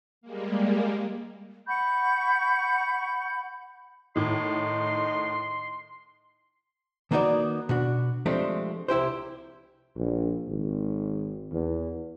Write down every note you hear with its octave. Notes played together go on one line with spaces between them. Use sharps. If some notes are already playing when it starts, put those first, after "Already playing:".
G3 G#3 A#3
F#5 B5 C#6 G6
A2 D#3 D#4 C6
D#3 A#3 B3 D#4 F#4 D5
B2 D4 F#4
F3 G#3 A3 C4 D4 G4
C2 E4 G4 C5
A#1
G#1
E2